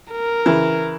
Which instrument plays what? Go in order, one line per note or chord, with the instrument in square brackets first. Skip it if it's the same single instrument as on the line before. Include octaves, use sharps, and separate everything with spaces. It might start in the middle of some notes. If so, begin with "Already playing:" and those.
[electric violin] A#4
[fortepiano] C#3 E3